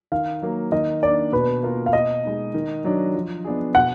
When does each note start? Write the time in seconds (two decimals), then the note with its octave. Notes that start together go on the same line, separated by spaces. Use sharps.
0.12 D#3 F5
0.42 F#3 A#3
0.72 D#3 D#5
1.02 A#3 D4 D5
1.32 B2 B4
1.63 A#3 F4 A#4
1.86 F5
1.93 B2 D#5
2.24 G#3 D#4
2.54 D#3
2.84 F#3 D4
3.14 F3
3.44 B3 D4 G#4
3.75 B2 F#5